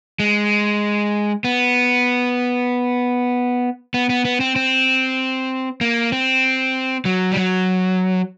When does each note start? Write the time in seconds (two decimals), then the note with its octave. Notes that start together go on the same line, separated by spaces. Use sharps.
0.20 G#3
1.44 B3
3.94 B3
4.09 B3
4.25 B3
4.40 C4
4.56 C4
5.81 A#3
6.12 C4
7.05 F#3
7.32 G3
7.37 F#3